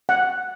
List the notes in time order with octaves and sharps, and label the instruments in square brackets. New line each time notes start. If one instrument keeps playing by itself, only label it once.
[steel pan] F#5